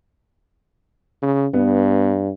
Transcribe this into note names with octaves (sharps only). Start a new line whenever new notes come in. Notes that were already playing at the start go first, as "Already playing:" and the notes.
C#3
G2 B3